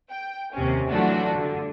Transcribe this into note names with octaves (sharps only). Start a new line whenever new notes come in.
G5
D#2 C3 C#4
E3 F#3 A3 D4 F4 F#4
G2 D3